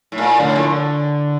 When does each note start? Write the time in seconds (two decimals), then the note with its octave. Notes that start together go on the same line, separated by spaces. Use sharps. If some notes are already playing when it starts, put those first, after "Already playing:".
0.12 A2
0.18 A#2
0.40 A2 D3
0.56 A#2